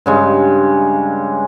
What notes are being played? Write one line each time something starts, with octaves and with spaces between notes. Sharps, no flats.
G2 C#3 G#3